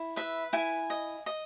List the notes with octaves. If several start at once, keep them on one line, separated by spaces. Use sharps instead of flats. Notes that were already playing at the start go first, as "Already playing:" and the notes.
Already playing: E4
B4 E5
E4 G#5
D#5
D#5